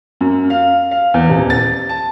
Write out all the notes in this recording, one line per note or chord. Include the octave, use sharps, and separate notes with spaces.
F#2
F5
F5
E2
D#1
A6
A5